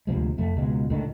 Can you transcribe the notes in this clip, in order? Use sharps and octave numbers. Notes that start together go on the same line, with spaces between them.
D2 C3 F3 G#3
F1 F2 A3
C#2 B2 G#3
C#2 A2 D3 D#3